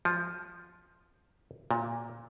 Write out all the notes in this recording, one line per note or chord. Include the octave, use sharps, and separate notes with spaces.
F3
A#2